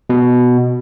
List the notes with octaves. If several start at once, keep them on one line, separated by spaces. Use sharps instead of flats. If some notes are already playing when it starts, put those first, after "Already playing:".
B2